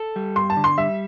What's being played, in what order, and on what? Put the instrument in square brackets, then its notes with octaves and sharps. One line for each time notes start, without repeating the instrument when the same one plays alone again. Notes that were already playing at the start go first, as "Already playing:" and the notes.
Already playing: [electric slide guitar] A4
G3
[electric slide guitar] G2 [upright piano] C6
[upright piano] A5
[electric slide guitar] D3
[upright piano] C6
[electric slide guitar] G3 [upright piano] E5